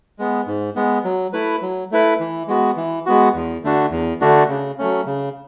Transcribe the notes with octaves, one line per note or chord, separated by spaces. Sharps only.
G#3 B3
G#2
G#3 B3
F#3
A3 E4 B4
F#3
A3 E4 B4
E3
G#3 B3 F#4
E3
G#3 B3 F#4
E2
D3 A3 D4 F#4
E2
D3 A3 D4 F#4
C#3
F#3 A3 C#4
C#3